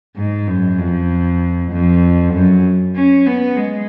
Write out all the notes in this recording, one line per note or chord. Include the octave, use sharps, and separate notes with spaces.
G#2
F#2
F2
F2
F#2
C#4
B3
G#3